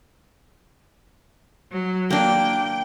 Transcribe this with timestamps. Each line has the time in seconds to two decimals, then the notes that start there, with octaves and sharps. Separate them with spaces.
1.72 F#3
2.10 A#3 D4 G5